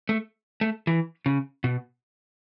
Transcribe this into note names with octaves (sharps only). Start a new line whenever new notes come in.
A3
A3
E3
C#3
B2